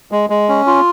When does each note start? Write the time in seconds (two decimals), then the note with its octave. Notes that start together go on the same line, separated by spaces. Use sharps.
0.12 G#3
0.30 G#3
0.49 C#4
0.67 F4